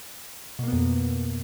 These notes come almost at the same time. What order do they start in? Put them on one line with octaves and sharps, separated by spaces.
B2 A#3 B3 F2